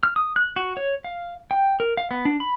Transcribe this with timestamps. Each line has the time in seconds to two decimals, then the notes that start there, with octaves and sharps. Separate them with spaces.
0.03 F6
0.16 D#6
0.36 F#6
0.56 F#4
0.77 C#5
1.04 F5
1.51 G5
1.80 A#4
1.97 F5
2.11 B3
2.25 D4
2.40 B5